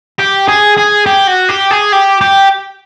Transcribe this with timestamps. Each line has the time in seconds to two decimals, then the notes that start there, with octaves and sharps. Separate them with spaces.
0.19 G4
0.48 G#4
0.77 G#4
1.06 G4
1.27 F#4
1.49 G4
1.71 G#4
1.93 G4
2.21 G4